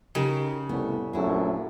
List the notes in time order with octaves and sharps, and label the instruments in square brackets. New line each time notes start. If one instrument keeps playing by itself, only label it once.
[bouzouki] C#3 [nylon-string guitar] D#4 G4 A#4
[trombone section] C2 A2 [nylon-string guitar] B3
[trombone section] A#1 F#2 A3 [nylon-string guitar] E4 G#4